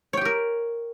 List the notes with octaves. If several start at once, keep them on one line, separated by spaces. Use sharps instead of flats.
G4 A#4 C#5 G5